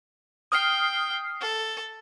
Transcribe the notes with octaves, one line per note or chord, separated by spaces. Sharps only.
G5 D#6 F6 C7
A4